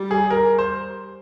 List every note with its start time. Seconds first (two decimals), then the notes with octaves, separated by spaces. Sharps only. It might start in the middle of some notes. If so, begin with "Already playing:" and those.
Already playing: G3
0.11 G#4
0.30 A#4
0.59 C5